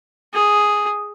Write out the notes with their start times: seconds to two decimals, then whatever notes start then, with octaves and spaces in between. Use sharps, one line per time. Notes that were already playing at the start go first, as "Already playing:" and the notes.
0.33 G#4